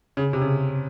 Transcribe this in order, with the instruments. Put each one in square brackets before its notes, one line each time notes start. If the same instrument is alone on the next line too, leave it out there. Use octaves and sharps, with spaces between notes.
[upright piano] C#3
C3
C#3